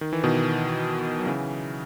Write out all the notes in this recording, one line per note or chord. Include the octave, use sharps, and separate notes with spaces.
D#3
E3
B2 D#3
F#3
C#3 E3